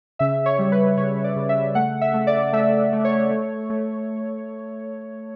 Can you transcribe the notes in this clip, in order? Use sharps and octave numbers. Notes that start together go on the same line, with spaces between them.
C#3 E5
C#5
G3
B4
C#3 C#5
D5
C#3
E5
A3 F#5
E5
A3
D5
A3 E5
A3
C#5
A3
A3